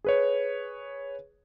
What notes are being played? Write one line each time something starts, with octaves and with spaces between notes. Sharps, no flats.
G#4 B4 C#5